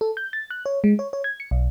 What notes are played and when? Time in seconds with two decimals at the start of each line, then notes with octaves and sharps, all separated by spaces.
0.01 A4
0.17 G6
0.33 A6
0.51 F#6
0.66 C#5
0.84 G#3
0.99 C#5
1.13 C#5
1.24 G#6
1.40 C#7
1.51 B1